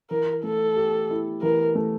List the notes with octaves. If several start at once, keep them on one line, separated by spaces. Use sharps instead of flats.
E3 A#4
A3 A4
G4
E4
E3 A#4
A3